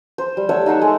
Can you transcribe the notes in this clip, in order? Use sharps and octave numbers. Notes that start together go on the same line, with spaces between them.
C5
G3
A3 C#5 E5 F#5
D#4 F#5 C6 C#6
G#3 A4